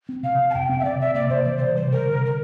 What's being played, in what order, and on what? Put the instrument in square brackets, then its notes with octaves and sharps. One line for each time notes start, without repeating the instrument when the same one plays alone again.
[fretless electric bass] C4
[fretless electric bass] C3 [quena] F5
[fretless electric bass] C3
[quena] A5
[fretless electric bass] F2 [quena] G5
[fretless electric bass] C4 [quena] G5
[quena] E5
[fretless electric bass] C3 [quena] D5
[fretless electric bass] C3 [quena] E5
[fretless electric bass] A#3 [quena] D5
[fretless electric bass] C3 [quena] C5
[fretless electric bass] E3 [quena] D5
[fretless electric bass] C3 [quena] C5
[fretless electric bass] G3 [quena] C5
[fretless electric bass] C3 [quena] A#4
[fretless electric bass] D3
[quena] A#4